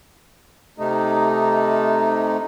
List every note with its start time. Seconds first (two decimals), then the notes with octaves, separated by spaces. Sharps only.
0.78 C3 A3 D#4